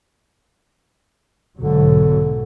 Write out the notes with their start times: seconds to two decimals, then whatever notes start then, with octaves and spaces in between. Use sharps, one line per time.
1.60 B1 G#2 D3 F#3